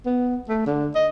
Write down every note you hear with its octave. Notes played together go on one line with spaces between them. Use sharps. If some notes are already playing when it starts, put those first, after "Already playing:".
B3
A3
D3
D#5